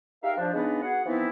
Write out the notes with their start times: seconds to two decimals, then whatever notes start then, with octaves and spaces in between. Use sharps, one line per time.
0.23 D#4 G4 A#4 E5 F5
0.37 F3 D4
0.53 C#3 G#3 B3 D4 D#4 B4
0.83 B3 F#4 G#4 F#5
1.06 E3 F3 B3 C4 D#4 E4